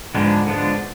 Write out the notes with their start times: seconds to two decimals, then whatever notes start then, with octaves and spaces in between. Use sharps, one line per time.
0.14 G#2 D3 F3 G#3 B3 D4
0.47 D3 F3 G#3 B3 D4